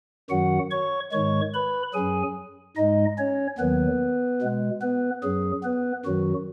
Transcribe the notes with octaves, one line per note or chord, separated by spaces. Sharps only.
F#2 D#3 F#3 F#4 F#5
C#5 C#6
G#2 D#3 G#3 C#5 C#6
B4 B5
F#2 F#3 G#4 G#5
G#2 G#3 D#4 D#5
C#4 C#5
D#2 D#3 F#3 B3 B4
B2 G#3
B3 B4
F#2 F#3 G#4
B3 B4
F#2 D#3 F#3 F#4